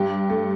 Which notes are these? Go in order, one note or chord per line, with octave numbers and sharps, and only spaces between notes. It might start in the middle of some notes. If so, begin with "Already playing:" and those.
Already playing: G2 G4
A3